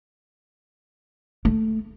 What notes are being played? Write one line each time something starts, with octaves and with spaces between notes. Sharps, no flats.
A3